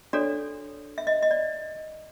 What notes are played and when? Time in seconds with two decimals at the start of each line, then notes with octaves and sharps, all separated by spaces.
0.13 D4 F#4 A4 C#5 D5
0.98 E5
1.07 D#5
1.22 D#5
1.31 D5